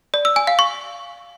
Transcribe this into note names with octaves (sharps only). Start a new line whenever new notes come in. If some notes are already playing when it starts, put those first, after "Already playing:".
D5
E6
G#5
F5
C#6